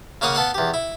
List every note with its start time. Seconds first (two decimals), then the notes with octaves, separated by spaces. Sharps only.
0.21 C#3 A#3 C#5 F5 F#5 D#6
0.35 B3 A4 F5 F#5
0.54 E2 G4
0.74 E4